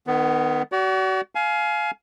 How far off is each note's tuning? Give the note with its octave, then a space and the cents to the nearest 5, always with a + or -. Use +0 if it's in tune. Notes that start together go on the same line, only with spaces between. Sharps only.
D#3 -25 B3 +15
F#4 +35 D5 -35
F5 +0 G#5 +30